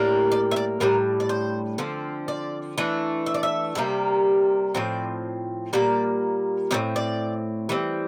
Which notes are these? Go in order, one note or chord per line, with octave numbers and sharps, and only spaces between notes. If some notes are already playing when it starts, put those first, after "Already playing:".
Already playing: A2 G3 A#3 D4
D5
E5
D5
A2 G3 D4 A#4
D5
C5
D3 F3 C4
D5
E3 A3 D4
E5
D5
E5
C3 G3 A#3
A2 F3 C4 D5
A#2 G3 A#3 D5
A2 G3 C4 D5
D5
E3 G3 C4